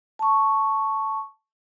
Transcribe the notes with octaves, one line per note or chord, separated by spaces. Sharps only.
A5 C#6